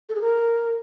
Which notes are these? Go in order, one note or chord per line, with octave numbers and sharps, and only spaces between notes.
A4
G#4
A#4